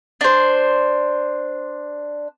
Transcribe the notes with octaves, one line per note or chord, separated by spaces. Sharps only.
D4 C5